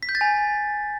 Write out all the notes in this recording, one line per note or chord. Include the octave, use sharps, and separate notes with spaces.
B6
G6
A6
G#5